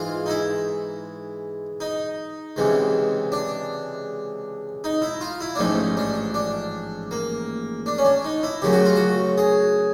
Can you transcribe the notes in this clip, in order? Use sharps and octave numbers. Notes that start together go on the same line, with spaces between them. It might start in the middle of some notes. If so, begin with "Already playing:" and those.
Already playing: G#2 E3 G#3 F4
D#4
E4
D#4
C#2 C3 E3 G#3
D4
D#4
E4
F4
E4
D4
A1 G#2 F3 A3 D#4
D4
D4
A#3
D4
C#4
D4
D#4
E4
F#2 C#3 F#3 A3 G4
F#4
F4
F#4
G#4